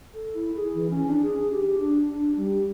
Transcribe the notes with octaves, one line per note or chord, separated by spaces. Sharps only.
A4
E4
G#4
E3
C#4
D4
G#4
G4
D4
D4
G3